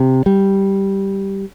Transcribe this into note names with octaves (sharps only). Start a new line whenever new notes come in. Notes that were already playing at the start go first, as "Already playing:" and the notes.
Already playing: C3
G3